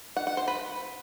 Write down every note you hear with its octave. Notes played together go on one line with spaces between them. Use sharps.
F#5
F#5
C5
B4